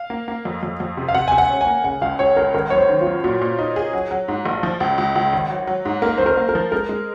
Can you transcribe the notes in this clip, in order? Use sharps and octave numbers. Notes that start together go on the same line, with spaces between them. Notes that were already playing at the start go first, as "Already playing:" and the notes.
Already playing: F5
A#3
A#3
F2
F2
F2
C3
F5
C3 F#5
C3 G#5
F#5
C#4
G#5
A#3
C#3 F#5
C#2 F5
C#2 C#5
C#2 A#4
G#1 A#4
F#2 C#5
C5
D#3
F4
F#2
A#2 F#4
A#2
D#4
G#4
F#3
F#3
G#2
A#1
F3
C#2
C#2
C#2
G#1
F#3
F#3
G#2
A#3 A#4
F#1 C5
A#4
A#3
A#4
F3
G#3 A#4
G#3